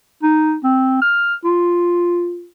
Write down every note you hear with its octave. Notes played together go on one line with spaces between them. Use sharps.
D#4
C4
F6
F4